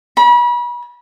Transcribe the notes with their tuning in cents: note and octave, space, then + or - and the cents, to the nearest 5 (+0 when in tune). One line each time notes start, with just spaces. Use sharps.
B5 -35